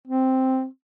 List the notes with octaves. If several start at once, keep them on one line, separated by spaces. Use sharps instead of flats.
C4